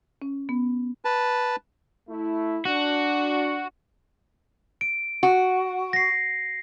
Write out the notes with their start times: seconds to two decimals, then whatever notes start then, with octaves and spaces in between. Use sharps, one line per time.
0.22 C#4
0.49 B3
1.05 B4 A5
2.08 A3 E4
2.65 D4 F#4
4.81 D7
5.23 F#4
5.93 A#6 C7